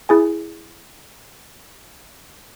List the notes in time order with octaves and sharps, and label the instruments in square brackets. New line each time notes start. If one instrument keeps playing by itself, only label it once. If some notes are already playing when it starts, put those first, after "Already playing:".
[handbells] E4 G#4 G#5